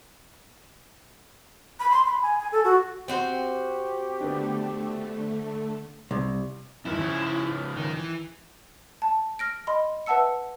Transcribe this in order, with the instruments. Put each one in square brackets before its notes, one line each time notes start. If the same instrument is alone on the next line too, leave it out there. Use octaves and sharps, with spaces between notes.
[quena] B5
C6
B5
G#5
G#5
A4
F#4
[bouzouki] C4 F#4 C5 [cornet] G4
[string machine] D3 A3 [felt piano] B3 D4
[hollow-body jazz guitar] C2
[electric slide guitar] E2 G2 D#3 [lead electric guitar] E4
[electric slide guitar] C#3 F3
[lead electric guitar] D#3
E3
[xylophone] A5
F6 A#6 D7
D#5 B5 C6
B4 E5 F#5 A5 E6 C#7